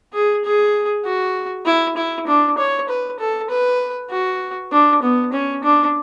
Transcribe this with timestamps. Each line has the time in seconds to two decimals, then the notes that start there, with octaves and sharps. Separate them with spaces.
0.14 G#4
0.45 G#4
1.05 F#4
1.66 E4
1.97 E4
2.27 D4
2.58 C#5
2.89 B4
3.20 A4
3.50 B4
4.10 F#4
4.72 D4
5.03 B3
5.33 C#4
5.64 D4